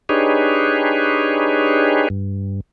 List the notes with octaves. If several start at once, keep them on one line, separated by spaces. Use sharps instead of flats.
D4 D#4 G4 G#4 B4 C#5
G2